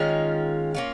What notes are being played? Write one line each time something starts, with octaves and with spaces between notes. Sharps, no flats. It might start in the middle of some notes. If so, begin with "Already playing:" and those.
Already playing: D#3 G#3 C#4 F4
A#3 C#4 F4